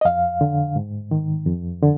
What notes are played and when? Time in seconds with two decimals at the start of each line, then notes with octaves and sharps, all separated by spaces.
0.01 D#5
0.05 F2 F5
0.41 D3
0.76 G#2
1.11 D#3
1.46 F2
1.82 D3